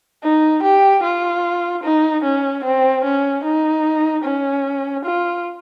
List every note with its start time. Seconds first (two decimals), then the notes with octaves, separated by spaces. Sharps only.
0.23 D#4
0.63 G4
1.03 F4
1.84 D#4
2.24 C#4
2.64 C4
3.04 C#4
3.44 D#4
4.24 C#4
5.05 F4